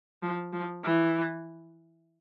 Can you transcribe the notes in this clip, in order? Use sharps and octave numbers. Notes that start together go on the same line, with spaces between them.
F3
F3
E3